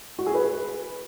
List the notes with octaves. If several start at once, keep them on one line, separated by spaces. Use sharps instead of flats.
F#4
G#4
B4